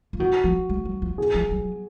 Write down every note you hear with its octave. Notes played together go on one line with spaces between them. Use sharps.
F3
D#3 F#4
F3
G#3
F#3
F3
G#4
F3
F#3